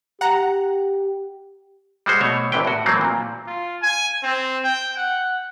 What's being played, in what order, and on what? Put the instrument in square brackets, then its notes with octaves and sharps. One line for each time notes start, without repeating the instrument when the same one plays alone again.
[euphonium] G4 [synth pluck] F#5 A#5
[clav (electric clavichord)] G3 G#3 F#4 C5
B2 A3 C#5
A#1 C3 E3 B4 G5
A2 F#4
E3 F#3 A3 A#3 C4
A#2
[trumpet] F4
G#5
C4
G5
F#5